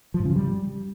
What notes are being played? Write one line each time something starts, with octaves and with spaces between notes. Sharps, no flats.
F3
G#2
C#3
F3
G3